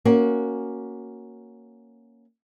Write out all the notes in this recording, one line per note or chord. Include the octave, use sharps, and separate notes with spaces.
A#3 C#4 F#4